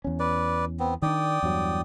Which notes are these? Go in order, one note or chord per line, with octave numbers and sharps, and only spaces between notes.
E2 C#4
B4 D5
B3 C4
D#3 D4 D5 G5 D#6
E2 G2 F#3